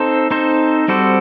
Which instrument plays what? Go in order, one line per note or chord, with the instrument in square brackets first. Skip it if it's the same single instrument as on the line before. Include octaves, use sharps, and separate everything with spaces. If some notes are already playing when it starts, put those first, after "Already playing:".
Already playing: [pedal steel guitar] C4 D#4 A4 C5
C4 D#4 A4 C5
G3 C4 F#4 A4 C5